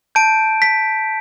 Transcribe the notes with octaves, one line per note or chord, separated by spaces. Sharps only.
A5 G6 D7
B6